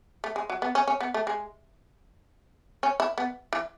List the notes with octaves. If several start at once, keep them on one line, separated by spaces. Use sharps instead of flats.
A3
G#3
F#3
B3
C#4
C#4
B3
A3
G#3
C#4
E4
B3
E3